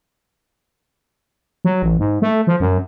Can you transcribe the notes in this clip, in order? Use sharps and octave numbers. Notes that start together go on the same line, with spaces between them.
F#3
A1
G#2
A3
F3
F#2